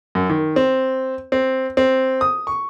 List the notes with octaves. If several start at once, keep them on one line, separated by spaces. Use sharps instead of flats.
F#2
D#3
C4
C4
C4
D#6
C#6